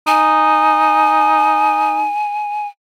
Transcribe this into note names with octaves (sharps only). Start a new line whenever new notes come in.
D#4 G#5